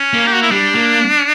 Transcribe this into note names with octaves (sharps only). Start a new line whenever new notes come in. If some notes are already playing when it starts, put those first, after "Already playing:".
Already playing: C#4
A#3
G4
F#4
E4
G3 D4
A#3